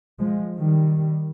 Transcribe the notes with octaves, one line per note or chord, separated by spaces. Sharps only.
F3 G#3
D#3 G3